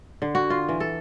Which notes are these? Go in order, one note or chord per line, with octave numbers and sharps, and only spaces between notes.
D3
F#4
F4
E3
A4